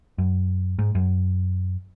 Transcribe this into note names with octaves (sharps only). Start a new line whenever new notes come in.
F#2
G#2
F#2